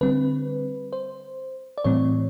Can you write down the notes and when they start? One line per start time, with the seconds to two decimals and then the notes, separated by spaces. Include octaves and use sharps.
0.01 D3 G3 C4 B4
0.93 C5
1.78 D5
1.84 A2 E3 G3 C4 C#5